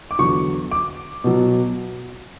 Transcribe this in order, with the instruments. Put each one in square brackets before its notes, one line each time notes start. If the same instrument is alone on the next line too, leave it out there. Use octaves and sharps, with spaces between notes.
[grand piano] D6
E2 D3 F#3 C#6
D6
B2 F#3